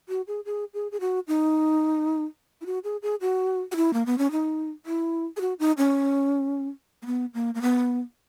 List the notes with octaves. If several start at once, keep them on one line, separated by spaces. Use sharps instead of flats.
F#4
G#4
G#4
G#4
G#4
F#4
D#4
E4
F#4
G#4
G#4
F#4
F#4
E4
A#3
B3
C#4
D#4
E4
G#4
F#4
D#4
C#4
A#3
B3
A#3
A#3
B3